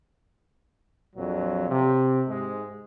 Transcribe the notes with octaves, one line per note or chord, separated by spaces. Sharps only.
A#1 F2 A#2 F#3
C3
G#2 G#3